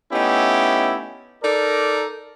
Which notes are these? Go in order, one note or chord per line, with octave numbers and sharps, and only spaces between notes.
A3 B3 C#4 D#4 E4 G4
D#4 A4 A#4 D5